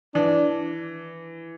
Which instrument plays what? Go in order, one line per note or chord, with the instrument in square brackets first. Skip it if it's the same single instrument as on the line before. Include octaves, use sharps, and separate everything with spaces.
[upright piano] E3 [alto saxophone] D4